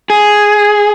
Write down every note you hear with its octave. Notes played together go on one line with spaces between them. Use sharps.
G#4